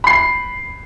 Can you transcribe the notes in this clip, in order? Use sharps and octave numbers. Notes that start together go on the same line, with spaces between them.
B5 C7